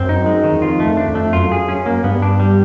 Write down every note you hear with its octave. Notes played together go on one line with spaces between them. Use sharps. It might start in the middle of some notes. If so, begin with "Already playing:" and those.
Already playing: F#2 C4
D#4
G#3
D#3
E2
F2 F4
A3
F2
D4
F2
A3
F#2 F4
G#4
C#4
A#3
G2 B3
D4
G3